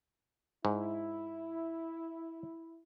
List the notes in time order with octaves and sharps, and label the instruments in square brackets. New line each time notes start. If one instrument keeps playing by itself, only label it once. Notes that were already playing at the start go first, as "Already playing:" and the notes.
[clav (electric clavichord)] G#2 [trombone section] E4